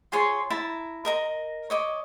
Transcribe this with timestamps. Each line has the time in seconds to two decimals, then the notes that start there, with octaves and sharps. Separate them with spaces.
0.12 F4 G#4 C#5 C6
0.50 E4 A5 A#5
1.05 A#4 D#5 A#5
1.70 C#5 D#5 D6